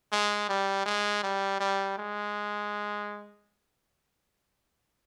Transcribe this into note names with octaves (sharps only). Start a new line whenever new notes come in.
G#3
G3
G#3
G3
G3
G#3